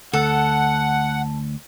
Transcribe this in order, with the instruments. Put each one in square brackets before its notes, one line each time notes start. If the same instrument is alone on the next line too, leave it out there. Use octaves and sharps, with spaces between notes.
[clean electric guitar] D2 [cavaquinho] A4 [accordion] F#5